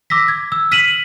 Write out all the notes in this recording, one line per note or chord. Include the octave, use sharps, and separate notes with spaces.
D6 E6 A#6 B6
G#6
E6
F6 B6 D#7 E7 F#7